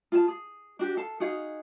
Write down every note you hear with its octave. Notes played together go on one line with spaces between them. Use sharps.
F4 G#4 A5
G#4
D4 F#4 G4
A4 F5 A5
D#4 F#4 G#4 F5